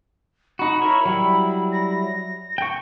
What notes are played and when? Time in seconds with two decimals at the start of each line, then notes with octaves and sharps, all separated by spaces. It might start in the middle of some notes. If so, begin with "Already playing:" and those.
0.59 D#4 F#4 B5
0.82 E4 A#4 C#5
1.05 F#3 G3 E4
1.72 A#6
2.58 G5 C#6